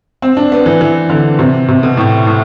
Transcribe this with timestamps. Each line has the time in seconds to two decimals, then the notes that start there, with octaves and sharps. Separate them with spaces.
0.22 C4
0.37 D4
0.52 B3
0.66 E3
0.81 E3
1.10 D3
1.39 C3
1.69 C3
1.83 B2
1.97 A2
2.27 A2